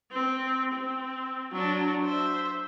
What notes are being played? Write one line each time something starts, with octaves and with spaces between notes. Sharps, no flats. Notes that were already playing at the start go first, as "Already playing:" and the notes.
C4
C4
F#3 D4
C5 E5